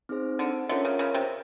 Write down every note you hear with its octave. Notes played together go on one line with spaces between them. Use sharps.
C4 D#4 G#4 C5
D3
D3 C#4 F4 A#4 C#5 E5
C#3
C#3
C3